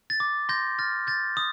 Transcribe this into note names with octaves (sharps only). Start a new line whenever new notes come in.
A6
D6
C6 G6 A#6
F6 A6
G6 A6
D#6